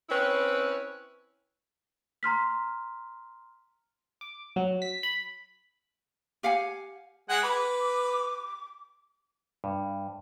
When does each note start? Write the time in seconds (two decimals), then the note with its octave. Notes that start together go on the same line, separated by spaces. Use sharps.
0.09 C4 C#4 E4 B4 C#5
2.23 A#5 C6 F6 B6
4.21 D6
4.56 F#3
4.82 B6
5.03 B5
6.43 G4 F5 F#5 G#5
7.29 G#3 F#5 G#5
7.43 B4 D6
9.64 G2